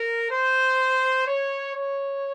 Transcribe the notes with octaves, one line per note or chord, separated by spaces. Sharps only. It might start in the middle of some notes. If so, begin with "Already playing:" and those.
Already playing: A#4
C5
C#5
C#5